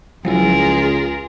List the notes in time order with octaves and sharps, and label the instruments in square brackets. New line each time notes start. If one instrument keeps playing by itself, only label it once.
[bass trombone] C#2 [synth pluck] F3 F#3 E4 [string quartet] F4 G#4 A#4